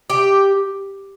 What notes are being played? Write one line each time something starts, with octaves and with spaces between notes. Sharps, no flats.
G4